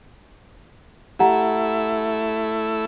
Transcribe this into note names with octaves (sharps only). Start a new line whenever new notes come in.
A3 E4 G4 F#5 A#5